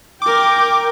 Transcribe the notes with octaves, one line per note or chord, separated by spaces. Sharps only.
A#4 G5 D6